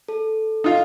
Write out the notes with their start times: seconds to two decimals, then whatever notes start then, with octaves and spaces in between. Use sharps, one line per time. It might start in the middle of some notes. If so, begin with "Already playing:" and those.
0.08 A4
0.64 D#4 F4 F5